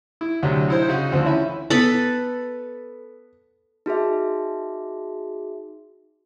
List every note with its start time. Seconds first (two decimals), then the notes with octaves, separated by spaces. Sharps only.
0.21 E4
0.43 D2 C3 F#3
0.68 D#4 E4 C5
0.88 C#3 D#4 F#4
1.12 D2 F3 C4
1.25 E3 C#4 E5 B5
1.70 B3 A4 B4 B5
3.86 D#4 F#4 G#4 E5